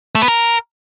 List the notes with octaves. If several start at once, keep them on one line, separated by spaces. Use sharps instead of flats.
A3
B3
A#4